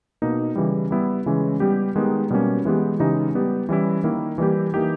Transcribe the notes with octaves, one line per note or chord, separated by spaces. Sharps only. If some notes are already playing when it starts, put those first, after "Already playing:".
B2 A#3 D#4
C#3 E3 G3
G3 B3 E4
C#3 E3 G#3 C#4
G3 B3 G4
D#3 G#3 B3 D#4 G4
B2 G3 A#3 C#4
E3 G#3 B3 G4
C#3 E3 G#3 D#4 G4
G3 B3 G4
E3 G3 C#4 E4
D#3 A#3 E4
E3 G3 A#3 E4 G4
E3 A#3 D#4 G4